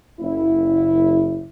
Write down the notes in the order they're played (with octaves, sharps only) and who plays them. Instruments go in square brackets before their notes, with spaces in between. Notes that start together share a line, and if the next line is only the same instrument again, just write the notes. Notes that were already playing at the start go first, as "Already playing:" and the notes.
[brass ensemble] F#1 E4